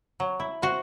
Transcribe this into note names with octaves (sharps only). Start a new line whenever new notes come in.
F#3
E4
F#4 C5